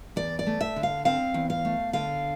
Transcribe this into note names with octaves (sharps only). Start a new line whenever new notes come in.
E2 D5
D5
A3
E5
D3
F5
C4 F5
E2
F5
A3
D3 F5